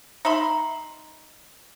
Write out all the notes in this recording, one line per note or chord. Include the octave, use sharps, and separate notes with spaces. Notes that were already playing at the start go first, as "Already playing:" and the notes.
D#4 E5 B5 C6